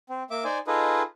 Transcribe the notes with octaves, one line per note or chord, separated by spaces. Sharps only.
C4
A#3 E5 D6
D#4 C5 D5 G#5
D#4 F4 G#4 A4 B4 D#5